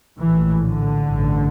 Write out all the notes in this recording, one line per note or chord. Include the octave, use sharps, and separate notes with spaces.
A#1 A2 E3
D3
A1 G2